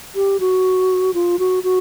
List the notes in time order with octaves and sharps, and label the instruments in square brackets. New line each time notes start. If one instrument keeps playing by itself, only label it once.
[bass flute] G4
F#4
F4
F#4
F#4